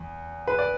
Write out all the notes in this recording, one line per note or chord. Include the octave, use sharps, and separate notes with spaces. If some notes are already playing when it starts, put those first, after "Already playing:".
Already playing: E2
B4
D5